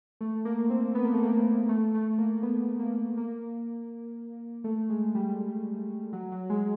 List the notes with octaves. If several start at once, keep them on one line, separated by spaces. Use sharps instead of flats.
A3
A#3
C4
B3
A#3
A3
A#3
A3
A3
A#3
B3
A#3
A#3
A3
G#3
G3
F#3
F#3
G#3